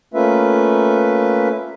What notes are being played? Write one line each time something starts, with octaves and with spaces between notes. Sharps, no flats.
A3 A#3 C#4 F4 B4 E5